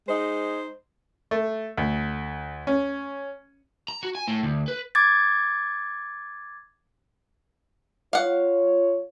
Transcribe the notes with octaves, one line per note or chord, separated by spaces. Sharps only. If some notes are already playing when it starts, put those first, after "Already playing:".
G#3 D#4 C5
A3
D2
C#4
A#5
F#4
G#5
A2
D2
B4
D6 G#6 A6
F4 C#5 F5 F#5